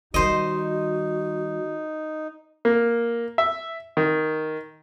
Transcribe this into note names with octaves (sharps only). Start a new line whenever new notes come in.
D#3 G3 D#4 F#4 C5 D#5
A#3
E5
D#3